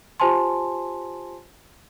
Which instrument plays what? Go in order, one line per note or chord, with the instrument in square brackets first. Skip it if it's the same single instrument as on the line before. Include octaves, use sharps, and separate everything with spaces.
[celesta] F4 G4 C5 G#5 A5 C6